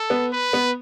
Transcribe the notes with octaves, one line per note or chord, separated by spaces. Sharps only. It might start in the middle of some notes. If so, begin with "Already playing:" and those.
Already playing: A4
B3
B4
B3